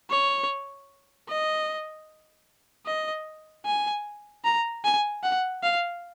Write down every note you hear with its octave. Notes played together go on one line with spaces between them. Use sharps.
C#5
D#5
D#5
G#5
A#5
G#5
F#5
F5